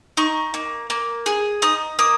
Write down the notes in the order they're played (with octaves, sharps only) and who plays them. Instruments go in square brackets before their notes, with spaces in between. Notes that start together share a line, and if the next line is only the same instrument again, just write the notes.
[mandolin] D#4 C#6
A#3
A#3
G#4
D#4 D#6
A#3 D#6